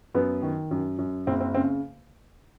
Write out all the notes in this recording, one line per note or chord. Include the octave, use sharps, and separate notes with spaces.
F#2 B3
D#3
F#2
F#2
F#1 C4
C4
C#3 C4